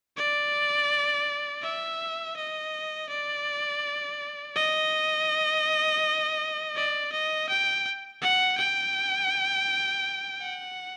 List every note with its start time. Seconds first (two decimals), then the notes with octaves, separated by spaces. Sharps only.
0.17 D5
1.62 E5
2.36 D#5
3.09 D5
4.56 D#5
6.76 D5
7.12 D#5
7.49 G5
8.22 F#5
8.58 G5
10.41 F#5